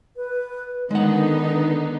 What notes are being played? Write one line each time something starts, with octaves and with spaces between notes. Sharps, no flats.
B4
D3 D#3 G#3 B3 D#4 D#5 F#5